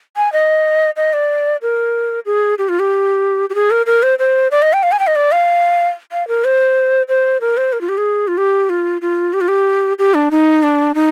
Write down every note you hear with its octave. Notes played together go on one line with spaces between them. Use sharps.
G#5
D#5
D#5
D5
A#4
G#4
G4
F4
G4
G4
G#4
A#4
A#4
C5
C5
D5
D#5
G5
F5
G#5
G5
D#5
D5
F5
F5
A#4
C5
C5
A#4
C5
A#4
F4
G4
G#4
F4
G4
F4
F4
G4
F4
G4
G4
D4
D#4
D4
D#4